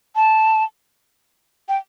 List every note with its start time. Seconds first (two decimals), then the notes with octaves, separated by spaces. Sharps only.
0.16 A5
1.68 G5